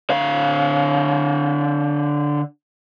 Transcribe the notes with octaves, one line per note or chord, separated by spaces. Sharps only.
D3 F5